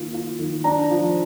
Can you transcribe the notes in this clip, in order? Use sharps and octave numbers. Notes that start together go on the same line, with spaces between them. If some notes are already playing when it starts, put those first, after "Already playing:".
Already playing: D#3 A#3 F4
F4
D#3
D4 A#5
F3